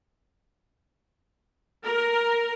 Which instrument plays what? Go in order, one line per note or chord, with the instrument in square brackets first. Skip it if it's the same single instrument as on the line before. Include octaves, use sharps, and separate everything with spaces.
[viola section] A#4